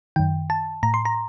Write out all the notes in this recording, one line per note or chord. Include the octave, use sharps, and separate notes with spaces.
F#2 D#3 G5
A5
A2 A#5
C6
A#5